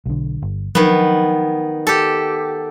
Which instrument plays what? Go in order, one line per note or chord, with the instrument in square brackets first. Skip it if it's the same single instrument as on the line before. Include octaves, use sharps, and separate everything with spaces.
[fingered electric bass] B1 D3
G1
[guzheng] D#3 B3 [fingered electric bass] F3 F#3 D4
[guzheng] G4 A4